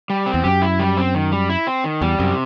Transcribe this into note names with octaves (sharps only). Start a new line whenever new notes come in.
G3
C4
E2
F#2 G4
E4
G3
C4
D#3
G3
E4
C4
D#3
E2 G3
F#2 C3